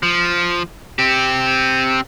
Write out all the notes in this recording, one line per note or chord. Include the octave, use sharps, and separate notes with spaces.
F3
C4 G4